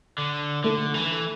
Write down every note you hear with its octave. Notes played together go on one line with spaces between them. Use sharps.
D3
D3 A3
E3